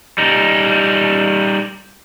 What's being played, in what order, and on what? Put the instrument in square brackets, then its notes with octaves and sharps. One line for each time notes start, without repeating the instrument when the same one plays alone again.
[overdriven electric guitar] G3 D#4